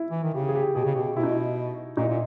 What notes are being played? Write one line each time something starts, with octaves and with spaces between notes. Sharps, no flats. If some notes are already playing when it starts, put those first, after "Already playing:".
Already playing: E4
E3
D#3
C#3 G4
G#4
G4
B2 G#4
C#3
B2 G4
B2 E4
D#4
E4
A#2 D#4
E4
A#2